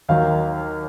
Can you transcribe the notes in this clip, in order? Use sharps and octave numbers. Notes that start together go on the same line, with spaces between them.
D#2 D#3 F#3 F5